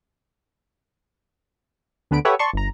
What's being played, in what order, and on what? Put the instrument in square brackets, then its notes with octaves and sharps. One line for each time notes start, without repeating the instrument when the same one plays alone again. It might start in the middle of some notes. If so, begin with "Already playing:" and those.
[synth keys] D2 D3 B3 B5 D7
G4 A4 B4 C#5 E5 F#5
D5 A5 C6 C#6
G1 A#5